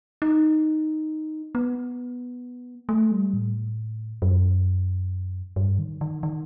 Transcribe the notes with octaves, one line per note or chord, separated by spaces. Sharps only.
D#4
B3
A3
G3
A2
F#2
G2
D#3
D#3
D#3